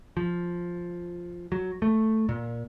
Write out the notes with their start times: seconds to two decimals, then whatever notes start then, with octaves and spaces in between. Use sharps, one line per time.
0.17 F3
1.52 F#3
1.82 A3
2.29 A#2